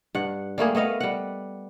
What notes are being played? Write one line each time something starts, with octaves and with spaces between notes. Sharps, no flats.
G2 F#5
G3 A3 A#3 G#4
A3 B3 D#5 F5
G3 F#5